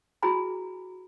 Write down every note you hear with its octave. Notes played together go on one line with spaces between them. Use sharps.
E4 F#4 G#4 G#5 A#5 B5